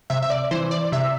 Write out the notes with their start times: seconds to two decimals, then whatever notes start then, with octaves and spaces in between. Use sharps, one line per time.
0.10 C3 E5
0.22 E5
0.30 D5
0.51 E3 C5
0.71 D5
0.92 C3 E5